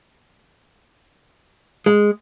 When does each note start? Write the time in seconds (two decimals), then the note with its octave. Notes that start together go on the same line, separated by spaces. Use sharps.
1.86 G#3